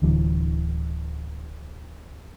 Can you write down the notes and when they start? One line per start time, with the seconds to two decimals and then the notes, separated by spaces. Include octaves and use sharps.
0.02 D1 D3 E3 F#3